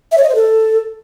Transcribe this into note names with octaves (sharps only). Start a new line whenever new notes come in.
E5
C#5
D#5
C5
A4